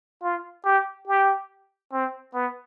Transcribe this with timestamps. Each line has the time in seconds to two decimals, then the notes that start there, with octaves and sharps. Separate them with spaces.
0.23 F4
0.65 G4
1.07 G4
1.92 C4
2.34 B3